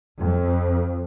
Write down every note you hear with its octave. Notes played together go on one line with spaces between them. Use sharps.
F2